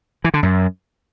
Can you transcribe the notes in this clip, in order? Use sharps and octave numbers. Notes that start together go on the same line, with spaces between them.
E3
D3
F#2